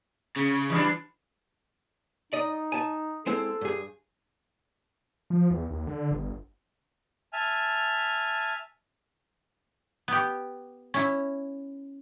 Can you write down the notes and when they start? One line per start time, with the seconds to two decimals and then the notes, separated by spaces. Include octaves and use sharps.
0.37 C#3
0.70 E3 G3 D4
2.33 D#4 D5 D#5
2.72 G#5 A5
3.26 G#3 C4 E4 A4
3.61 G2 G#4
5.30 F3
5.51 E2
5.70 D#2
5.87 D3
6.11 G1
7.33 E5 G#5 A5 F6
10.08 B3 G4
10.94 C#4 E4